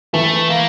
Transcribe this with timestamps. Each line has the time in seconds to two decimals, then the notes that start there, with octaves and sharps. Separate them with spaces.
0.14 E3 A3
0.50 A#3